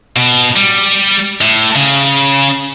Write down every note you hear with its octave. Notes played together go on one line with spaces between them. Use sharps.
B2
G3
A2
C#3